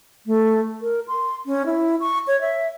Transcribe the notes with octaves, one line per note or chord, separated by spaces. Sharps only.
A3
A#4
C6
C#4
E4
C#6
C#5
E5